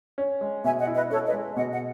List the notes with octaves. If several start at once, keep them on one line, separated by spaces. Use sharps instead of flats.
C#4
G#3
B2 E5 G#5
D#5 F#5
E4
B4 D#5
C#4 A4 C#5
B4 D#5
G#3
B2 D#5 F#5
D#5 F#5